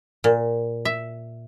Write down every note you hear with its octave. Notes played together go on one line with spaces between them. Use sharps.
A#2
E5